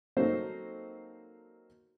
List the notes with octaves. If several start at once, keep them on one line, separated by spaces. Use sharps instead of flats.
F#3 A#3 C4 D#4 A4 C5